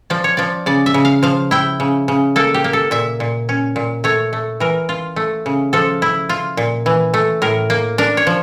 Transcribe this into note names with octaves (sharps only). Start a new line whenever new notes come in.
F3 D5
C#5
F3 D5
C#3 D5
E5
C#3
F5
F3 F5
E4 G5
C#3
C#3
A#3 A4
G4
A#3
A4
A#2 E5
A#2
C#4
A#2
A3 C#5
A3
E3 A#4
F4
A3
C#3
F3 A4
E4
F4
A#2
E3
A3
A2 A#4
A#3
D4 A#4
C#5
F3